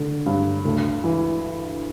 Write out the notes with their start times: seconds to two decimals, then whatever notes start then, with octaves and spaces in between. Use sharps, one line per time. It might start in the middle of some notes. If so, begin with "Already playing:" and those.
Already playing: D3
0.26 G2
0.65 D2
1.04 E3